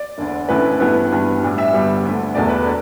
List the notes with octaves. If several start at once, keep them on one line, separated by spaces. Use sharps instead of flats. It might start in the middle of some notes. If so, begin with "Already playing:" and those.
Already playing: D5
E1 D2 D3
A1 A2 A3 E4 B4
G2 E3 B3 E4 B4
G2 E3 B3
A2 G3 D4
E5
G1 G2 G3 B3
D2 D3 A3
E1 E2 B2 A3 D4 D5
B4
A4